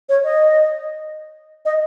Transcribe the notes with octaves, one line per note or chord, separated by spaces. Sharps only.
C#5
D#5
D#5